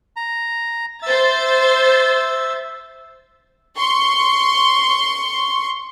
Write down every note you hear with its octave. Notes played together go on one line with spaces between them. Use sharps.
A#5
C5 E5 E6 A6
C6 C#6